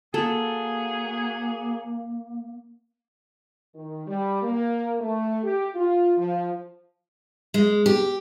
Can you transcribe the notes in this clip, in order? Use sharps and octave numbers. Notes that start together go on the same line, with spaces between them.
F#3 A#3 G#4 A4
D#3
G3
A#3
A3
G4
F4
F3
G#3
G4